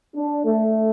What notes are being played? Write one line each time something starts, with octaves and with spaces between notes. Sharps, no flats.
D4
A3